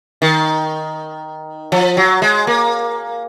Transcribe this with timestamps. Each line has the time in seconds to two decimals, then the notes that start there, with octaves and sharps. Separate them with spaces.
0.22 D#3
1.72 F3
1.97 F#3
2.22 G#3
2.47 A#3